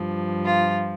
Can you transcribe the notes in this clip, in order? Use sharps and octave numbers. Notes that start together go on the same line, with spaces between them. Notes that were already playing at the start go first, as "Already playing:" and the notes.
Already playing: G2 F3
F4